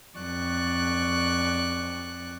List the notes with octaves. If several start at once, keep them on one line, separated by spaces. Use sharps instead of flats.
F2 D5 C#6 F#6